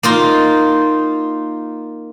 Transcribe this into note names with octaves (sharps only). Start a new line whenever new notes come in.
A#3 D#4 F4